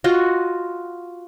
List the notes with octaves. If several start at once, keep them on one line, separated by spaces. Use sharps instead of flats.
F4 F#4 D#5